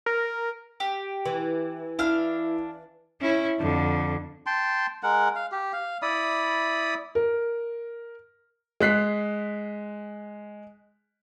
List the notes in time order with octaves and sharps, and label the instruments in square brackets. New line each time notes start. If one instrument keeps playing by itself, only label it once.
[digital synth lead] A#4
[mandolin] G4
[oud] E3
[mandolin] D4 F5 F6 [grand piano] E4
[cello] C#4 E4
F2 D3
[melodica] G5 A5 C6
G#3 A#4 F#5
F5
G4
F5
E4 D5 B5 D#6
[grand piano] A#4
G#3 F#6 B6 C7